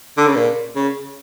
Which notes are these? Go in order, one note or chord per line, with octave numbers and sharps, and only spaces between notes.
D3
C#3
A#2
C#3